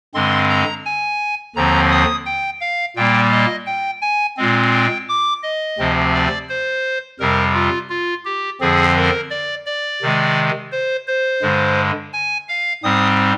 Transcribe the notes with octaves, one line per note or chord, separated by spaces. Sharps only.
G2 D3 G#3 C4 C6
A#5
G#5
D#2 D3 F3 C4 A#5
D#6
G5
F5
A#2 G3 A#3 G5
D#5
G5
G#5
A#2 G#3 C4
G5
D6
D#5
D2 C3 F3 C4
D5
C5
F2 C3 G3 A#4
F4
F4
G4
F2 D3 F3 C4 G#4
A#4
D5
D5
C3 D#3 G#3
C5
C5
G2 D3 G#3
G#5
F5
G#2 G3 C4 D#6